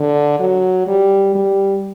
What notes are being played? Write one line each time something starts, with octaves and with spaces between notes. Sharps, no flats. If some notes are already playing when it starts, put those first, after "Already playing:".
Already playing: D3
F#3
G3
G3